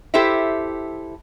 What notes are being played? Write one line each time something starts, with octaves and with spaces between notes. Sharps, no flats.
E4 G4 A4 C5 E5